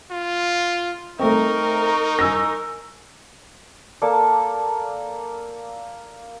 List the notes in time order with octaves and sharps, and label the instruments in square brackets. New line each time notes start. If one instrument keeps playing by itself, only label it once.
[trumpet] F4
[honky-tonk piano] A3 C4 [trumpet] D#4 [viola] A#4 [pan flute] C#6
[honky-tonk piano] G#5 E6 A#6
[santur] A#3 A4 D5